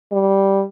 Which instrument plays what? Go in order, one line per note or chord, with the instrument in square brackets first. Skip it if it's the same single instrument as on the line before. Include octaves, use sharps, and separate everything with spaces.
[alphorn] G3